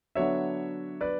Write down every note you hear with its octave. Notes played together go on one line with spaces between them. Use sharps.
D3 F#3 B3 D4 C#5 E5
B4 D5